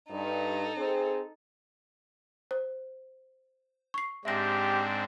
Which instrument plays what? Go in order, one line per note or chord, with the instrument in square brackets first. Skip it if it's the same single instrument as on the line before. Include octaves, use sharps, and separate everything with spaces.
[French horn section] G2 [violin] D#4 A4
[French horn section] C4 G#4
[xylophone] C5
C#6 C7
[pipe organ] G#2 C4 D4 [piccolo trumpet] G4 [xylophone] E5 A#6